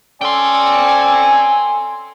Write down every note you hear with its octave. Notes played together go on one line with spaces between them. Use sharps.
C#4 A4 D5 G5 G#5 C6